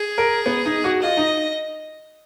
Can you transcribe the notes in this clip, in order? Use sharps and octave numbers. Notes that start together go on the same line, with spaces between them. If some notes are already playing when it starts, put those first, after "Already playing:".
Already playing: G#4
A#4
B3
D#4
F#4
F4 D#5
D#4